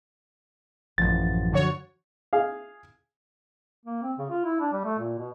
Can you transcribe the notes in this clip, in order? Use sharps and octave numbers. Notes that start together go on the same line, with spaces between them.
A1 F#2 F3 A6
D3 F#4 C#5
G#4 F5
A#3
C4
C#3
F4
E4
D4
G3
A3
A#2
B2